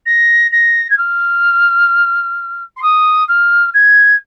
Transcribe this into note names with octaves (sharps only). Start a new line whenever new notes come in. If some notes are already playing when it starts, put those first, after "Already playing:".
A#6
A#6
G#6
F6
C6
D#6
F6
G#6